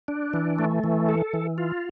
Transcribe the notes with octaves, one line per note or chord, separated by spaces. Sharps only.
D4
E3
A3
E3
A4
E3
F4